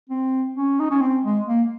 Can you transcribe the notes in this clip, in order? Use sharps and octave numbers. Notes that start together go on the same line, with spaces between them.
C4
C#4
D#4
C#4
C4
G#3
A#3